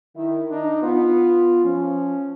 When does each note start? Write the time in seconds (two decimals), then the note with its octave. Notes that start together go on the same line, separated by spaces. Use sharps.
0.16 D#3 E4
0.50 D4 D#4
0.82 B3 F4
1.64 F3 C#4